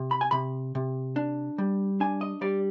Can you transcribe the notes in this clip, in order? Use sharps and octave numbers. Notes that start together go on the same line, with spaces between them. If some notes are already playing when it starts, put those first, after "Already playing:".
Already playing: C3
B5
G#5
C3 B5
C3
D4
G3
D4 G#5
D#5
G3 D5